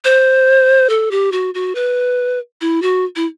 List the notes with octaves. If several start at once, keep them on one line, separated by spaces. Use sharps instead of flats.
C5
A4
G4
F#4
F#4
B4
E4
F#4
E4